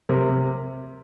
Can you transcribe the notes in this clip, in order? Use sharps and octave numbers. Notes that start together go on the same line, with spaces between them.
C3 A#4
C3